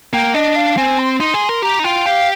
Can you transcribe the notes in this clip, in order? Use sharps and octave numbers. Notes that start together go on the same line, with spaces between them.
A#3 G5
D4 D#5
F5
C4 G#5
C6
D#4 C6
G#4
A#4
G4 A#5
D#4
F4 G5
G4 F5